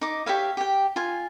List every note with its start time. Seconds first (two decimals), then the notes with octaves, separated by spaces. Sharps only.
0.01 D#4 D6
0.26 G4 C#5 E5 F5
0.57 G4 G5
0.96 F4 G#5